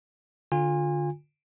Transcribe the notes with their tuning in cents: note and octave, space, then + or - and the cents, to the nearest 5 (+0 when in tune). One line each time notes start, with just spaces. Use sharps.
D3 +0 F4 +20 G#5 -30